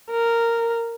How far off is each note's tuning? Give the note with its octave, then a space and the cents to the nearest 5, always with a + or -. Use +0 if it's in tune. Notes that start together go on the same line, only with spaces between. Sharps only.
A#4 -10